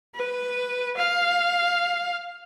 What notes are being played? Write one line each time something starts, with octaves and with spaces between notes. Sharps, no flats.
B4
F5